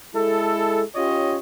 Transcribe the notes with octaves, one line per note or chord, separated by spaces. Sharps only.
G#3 E4 A4
C#4 F4 G4 C#5 D#5